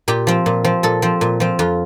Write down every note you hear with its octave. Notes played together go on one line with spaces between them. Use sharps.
A#2 G4
F3 C4
A#2
F3 C4
A#2 A4
F3 C4
A#2
F3 C4
F2 F4